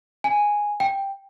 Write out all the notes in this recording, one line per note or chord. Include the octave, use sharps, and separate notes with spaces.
G#5
G5